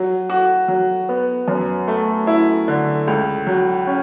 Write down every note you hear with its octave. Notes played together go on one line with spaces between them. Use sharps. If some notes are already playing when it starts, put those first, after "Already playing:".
Already playing: F#3
F#4
F#3
B3
F#2
A3
E4
D3
C#2
F#3
C#4